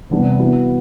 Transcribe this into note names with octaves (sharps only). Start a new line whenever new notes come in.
E2 C3 G3 B3 D4
E3 B3 F#4